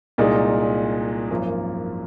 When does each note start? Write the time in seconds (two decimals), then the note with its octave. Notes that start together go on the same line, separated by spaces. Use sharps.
0.18 C2 A#2 G#3 D#4
1.30 G#1 F#2 F3 A#3